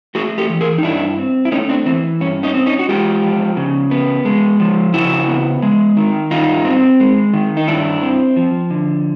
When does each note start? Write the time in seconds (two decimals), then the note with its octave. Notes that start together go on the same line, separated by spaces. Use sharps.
0.15 A3 F#4 G#4
0.38 G4 A4
0.49 E3
0.61 G#4 A#4
0.78 D#4
0.83 G2 D4 E4
1.18 C4
1.45 E4
1.52 A3 C#4 D#4
1.69 C4 D4
1.86 E3 C4
2.20 G2 C#4
2.43 C#4 D#4
2.54 C4
2.66 C#4 D#4
2.79 F#4
2.89 G#3 F4 G4
3.23 F3
3.57 C#3
3.91 B3
4.25 G#3
4.60 F3
4.94 C#3 E4 F#4
5.28 B3
5.62 G#3
5.97 D#3
6.31 G2 D#4 F4
6.65 C4
7.00 G#3
7.33 D#3
7.57 D#4
7.68 G2 D4 E4
8.02 C4
8.36 F3
8.70 D3